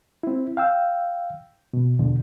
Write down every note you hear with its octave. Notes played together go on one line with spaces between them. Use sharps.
C4 E4
F5 G5 E6
B2
E2 B2 D3